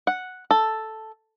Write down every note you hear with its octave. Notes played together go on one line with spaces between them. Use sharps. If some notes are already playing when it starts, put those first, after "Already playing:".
F#5
A4